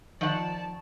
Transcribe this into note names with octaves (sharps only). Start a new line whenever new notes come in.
D#3 F3 D5 F#5 A5